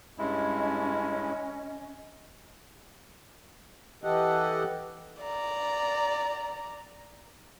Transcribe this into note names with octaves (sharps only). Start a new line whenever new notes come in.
G2 G#3 C#4 E4 D#5
E3 G4 A4 D#5 F#5
D5 A#5